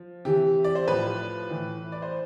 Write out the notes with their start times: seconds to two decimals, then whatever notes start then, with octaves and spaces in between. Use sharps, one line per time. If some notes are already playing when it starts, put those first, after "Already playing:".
Already playing: F3
0.25 C3 E3 G4
0.64 D5
0.75 C5
0.88 A2 F3 B4
1.50 A2 E3
1.92 D5
2.02 C5